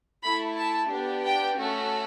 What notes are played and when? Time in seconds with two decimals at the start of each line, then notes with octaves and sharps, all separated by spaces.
0.23 A3 E4 A4 B5
0.57 A5
0.90 B3 D4 G4
1.24 G5
1.57 A3 C#4 F#4 A4